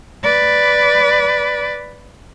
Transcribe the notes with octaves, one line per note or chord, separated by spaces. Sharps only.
B4 D5